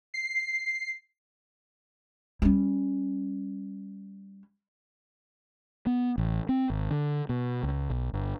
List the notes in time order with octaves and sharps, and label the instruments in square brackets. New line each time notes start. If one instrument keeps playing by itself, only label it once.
[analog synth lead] C7
[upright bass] G3 C#4
[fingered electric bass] B3
A1
C4
G#1
D3
B2
C#2
B1
G1